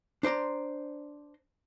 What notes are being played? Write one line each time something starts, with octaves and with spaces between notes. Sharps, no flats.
D4 C5 D5 A#5 C6